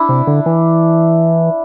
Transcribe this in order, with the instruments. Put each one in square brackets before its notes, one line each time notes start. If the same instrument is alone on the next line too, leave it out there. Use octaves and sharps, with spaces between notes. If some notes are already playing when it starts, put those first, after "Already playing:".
Already playing: [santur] D4 E4
[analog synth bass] C3
D3
E3